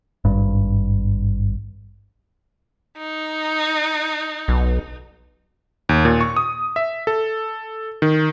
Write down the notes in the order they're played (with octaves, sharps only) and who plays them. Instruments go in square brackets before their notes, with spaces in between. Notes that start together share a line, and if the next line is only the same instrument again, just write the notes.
[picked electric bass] G#1 G2
[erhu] D#4
[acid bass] B1
[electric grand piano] D#2
A#2
C#6
D#6
E5
A4
D#3